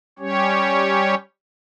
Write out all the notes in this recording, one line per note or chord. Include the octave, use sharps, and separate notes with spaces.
G3 C#4 G4 C#5